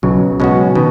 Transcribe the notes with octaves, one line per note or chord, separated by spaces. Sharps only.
B1 C#3 F#3
B2 G#3 C#4 F#4
B2 D#3